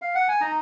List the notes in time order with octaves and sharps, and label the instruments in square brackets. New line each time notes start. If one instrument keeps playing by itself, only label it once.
[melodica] F5
F#5
G#5
D#4 A#5